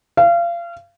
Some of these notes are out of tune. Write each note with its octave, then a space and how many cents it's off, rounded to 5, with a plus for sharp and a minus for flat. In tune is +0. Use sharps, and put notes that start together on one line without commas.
F5 -30